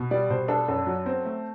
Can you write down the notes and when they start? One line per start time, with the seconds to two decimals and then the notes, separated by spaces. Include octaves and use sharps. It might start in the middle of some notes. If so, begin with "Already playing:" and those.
Already playing: B2
0.11 G3 D5
0.30 B2 C5
0.48 D4 A4
0.68 F#2 A4
0.87 F#3
1.06 C4
1.25 A3